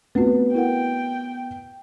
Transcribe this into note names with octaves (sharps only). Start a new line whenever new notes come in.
A3 B3 C4 F#4
E4 A#4 F#5 G5